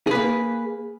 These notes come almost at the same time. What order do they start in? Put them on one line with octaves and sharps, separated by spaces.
G#4 B4 A#3